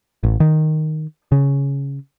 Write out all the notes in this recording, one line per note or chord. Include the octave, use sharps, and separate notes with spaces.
A1
D#3
C#3